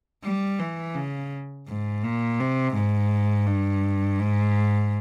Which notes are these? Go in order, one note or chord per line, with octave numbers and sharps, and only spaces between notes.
G3
E3
C#3
G#2
A#2
C3
G#2
G2
G#2